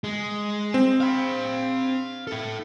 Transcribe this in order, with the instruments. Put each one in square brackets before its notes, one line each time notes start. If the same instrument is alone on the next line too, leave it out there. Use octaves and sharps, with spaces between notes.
[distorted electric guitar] G#3
[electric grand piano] C4
[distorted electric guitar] F5 B5
E4 A4